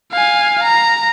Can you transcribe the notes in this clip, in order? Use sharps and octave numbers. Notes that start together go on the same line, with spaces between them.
F5 G#5
A#5